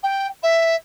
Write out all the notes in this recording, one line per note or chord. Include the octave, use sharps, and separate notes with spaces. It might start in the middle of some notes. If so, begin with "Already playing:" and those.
G5
E5